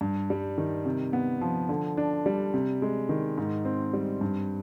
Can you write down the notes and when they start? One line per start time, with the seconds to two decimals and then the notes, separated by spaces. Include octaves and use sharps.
0.01 G2
0.30 G3
0.58 D#3
0.86 C3
1.13 B3
1.41 F3
1.69 D3
1.97 D4
2.26 G3
2.54 C3
2.82 G#3
3.09 D#3
3.37 G#2
3.65 C4
3.93 G3
4.21 G2